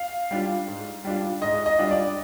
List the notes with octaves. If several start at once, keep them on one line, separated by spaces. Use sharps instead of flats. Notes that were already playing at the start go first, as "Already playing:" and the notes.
Already playing: F5
G3 D4 F4
G#2
G3 D4 F4
G#2 D#5
D#5
G3 D4 F4
D5